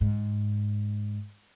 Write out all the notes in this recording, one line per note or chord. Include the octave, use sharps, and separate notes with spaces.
G#2